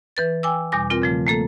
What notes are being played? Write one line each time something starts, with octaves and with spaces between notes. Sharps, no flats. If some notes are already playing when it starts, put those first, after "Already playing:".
E3 B4 A6
G5 G#5 D6 E6
E2 B2 G3 G#5 D6
C4 F4 A#4
C#3 F3 A3
A3 A#3 A4